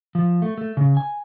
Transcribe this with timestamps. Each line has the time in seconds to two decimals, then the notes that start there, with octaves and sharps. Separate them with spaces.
0.15 F3
0.42 A3
0.58 A3
0.77 C#3
0.97 G#5